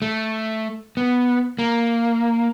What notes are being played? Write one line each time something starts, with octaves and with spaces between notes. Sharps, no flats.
A3
B3
A#3